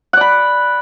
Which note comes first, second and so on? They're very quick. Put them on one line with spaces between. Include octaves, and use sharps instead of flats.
F#5 D5 B5